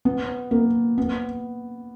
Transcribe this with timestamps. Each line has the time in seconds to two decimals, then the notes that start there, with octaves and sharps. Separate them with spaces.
0.05 B3
0.51 A#3
0.98 B3